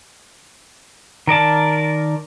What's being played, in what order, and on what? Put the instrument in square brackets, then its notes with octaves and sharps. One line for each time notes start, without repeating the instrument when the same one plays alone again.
[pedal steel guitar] D#3 A#4 D5 A5